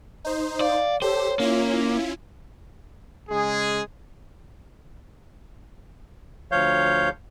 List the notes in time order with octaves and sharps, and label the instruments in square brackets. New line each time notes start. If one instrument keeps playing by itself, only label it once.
[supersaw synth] D#4 C5
[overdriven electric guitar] D5 [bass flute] F5
[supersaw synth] G4 A4 [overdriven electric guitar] C5 [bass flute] C#5
[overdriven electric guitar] A#3 [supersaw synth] C#4 E4 F4
[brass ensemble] C#3 G#3 G#4
[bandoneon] D2 F3 C#5 F5 G6